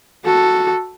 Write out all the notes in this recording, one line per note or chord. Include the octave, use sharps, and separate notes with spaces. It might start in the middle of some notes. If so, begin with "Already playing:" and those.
F#4 A4